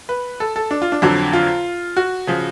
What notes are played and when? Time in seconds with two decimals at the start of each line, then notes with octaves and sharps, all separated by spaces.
0.09 B4
0.40 A4
0.56 A4
0.71 D4
0.82 F4
0.92 D4
1.02 F2 D3 F#3
1.33 F4
1.97 F#4
2.27 C#3 F3